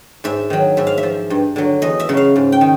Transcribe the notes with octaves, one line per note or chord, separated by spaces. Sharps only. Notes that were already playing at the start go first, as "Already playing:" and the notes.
G#2 E5
D#3 F#3
G#2 E5
F5
E5
F3
G2
D3 F#3
E2 D#5
E5
C#3 F#3
F5
G#2
G5
D#3